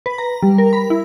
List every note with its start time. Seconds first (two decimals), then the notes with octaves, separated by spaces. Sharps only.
0.06 B4
0.18 A#5
0.43 G3
0.58 A#4
0.73 B5
0.90 E4